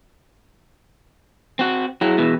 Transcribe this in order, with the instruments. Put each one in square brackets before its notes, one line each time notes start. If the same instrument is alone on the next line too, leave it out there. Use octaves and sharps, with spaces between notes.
[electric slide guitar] C4 F#4
[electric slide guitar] F#3 [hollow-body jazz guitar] E4 G#4 G5
[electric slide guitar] B2 E3